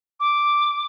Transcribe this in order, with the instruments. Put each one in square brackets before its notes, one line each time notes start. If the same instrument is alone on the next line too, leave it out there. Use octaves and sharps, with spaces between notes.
[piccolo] D6